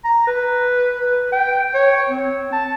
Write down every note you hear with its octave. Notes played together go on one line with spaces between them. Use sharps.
A#5
B4
B4
G5
C#5
C4
A5